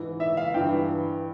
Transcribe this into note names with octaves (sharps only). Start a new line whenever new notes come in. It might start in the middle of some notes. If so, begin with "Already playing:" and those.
Already playing: G#2 E3
E5
F5
G2 E3 G5